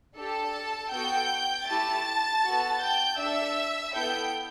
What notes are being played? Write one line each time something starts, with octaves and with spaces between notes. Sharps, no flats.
D4 G4 A4 A5
B3 F#4 A4 G5 G6
A3 E4 G4 A5 A6
B3 F#4 A4
G5 G6
D4 A4 E5 E6
B3 E4 A4 G5 G6